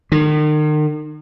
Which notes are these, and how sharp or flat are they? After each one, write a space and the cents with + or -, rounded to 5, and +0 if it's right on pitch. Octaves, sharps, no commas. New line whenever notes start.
D#3 -40